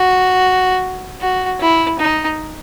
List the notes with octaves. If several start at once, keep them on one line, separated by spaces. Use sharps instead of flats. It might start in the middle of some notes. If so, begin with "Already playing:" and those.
Already playing: F#4
F#4
E4
D#4